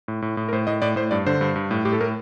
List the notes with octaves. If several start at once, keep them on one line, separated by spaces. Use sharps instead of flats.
A2
A2
A2
A#4
A2 C5
A2 D#5
A2 D5
A2 C5
G2 D5
D3 C5
G2
G2
A2
A2 G4
A4
A2 A#4